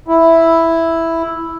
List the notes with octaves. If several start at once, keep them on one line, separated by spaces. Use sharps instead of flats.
E4